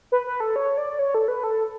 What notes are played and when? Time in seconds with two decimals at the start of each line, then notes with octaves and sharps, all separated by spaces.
0.12 B4
0.27 B4
0.40 A4
0.56 C#5
0.78 D5
0.99 C#5
1.15 A4
1.28 B4
1.43 A4